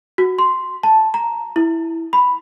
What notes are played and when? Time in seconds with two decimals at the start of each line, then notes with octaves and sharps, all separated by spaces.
0.18 F#4
0.39 C6
0.83 A5
1.14 A#5
1.56 E4
2.13 B5